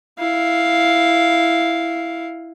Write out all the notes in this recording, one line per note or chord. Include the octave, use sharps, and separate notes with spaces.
E4 F5